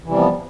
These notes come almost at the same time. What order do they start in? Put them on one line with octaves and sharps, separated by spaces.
E3 C3 G3 F3 B3